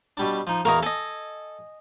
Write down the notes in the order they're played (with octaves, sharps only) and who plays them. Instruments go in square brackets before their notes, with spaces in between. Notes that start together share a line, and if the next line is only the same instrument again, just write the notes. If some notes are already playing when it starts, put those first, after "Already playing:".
[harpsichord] B2 G3 D4
F3 D#4
[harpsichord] E2 F#4 F5 [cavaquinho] A#4 D#5
[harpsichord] A4 [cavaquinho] D#5 G#5